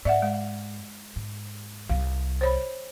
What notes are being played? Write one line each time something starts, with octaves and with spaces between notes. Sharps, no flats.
G#2 D5 E5 F#5
G#3
G#2
C2 G3 F5
C5 C#5 B5